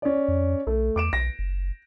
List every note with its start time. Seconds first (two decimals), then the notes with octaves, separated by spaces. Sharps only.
0.02 C#4 D5
0.28 F2
0.67 B1 A3
0.96 E2 D6 D7 E7
1.13 B1 A#6
1.39 F#1